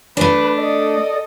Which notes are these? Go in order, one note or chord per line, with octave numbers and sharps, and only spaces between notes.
A3 D4 B4
A4 D5 D#5